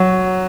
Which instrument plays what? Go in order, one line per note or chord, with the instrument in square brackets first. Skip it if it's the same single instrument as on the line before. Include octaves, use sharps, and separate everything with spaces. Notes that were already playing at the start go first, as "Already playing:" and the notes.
Already playing: [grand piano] F#3